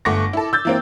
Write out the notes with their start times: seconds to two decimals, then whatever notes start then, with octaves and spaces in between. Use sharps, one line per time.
0.05 G1 A3 F#5 C#6 D6 A#6
0.33 E4 A4
0.53 E6 G6 A6
0.65 E3 A#3 C4